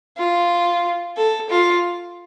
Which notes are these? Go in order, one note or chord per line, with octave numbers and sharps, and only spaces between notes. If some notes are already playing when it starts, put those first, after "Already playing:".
F4
A4
F4